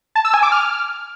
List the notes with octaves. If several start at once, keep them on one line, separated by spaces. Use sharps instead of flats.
A5
E6
G#5
D6
F6